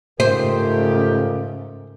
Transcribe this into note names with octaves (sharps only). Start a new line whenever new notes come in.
G#2 C#3 A3 F4 G4 A#4 C5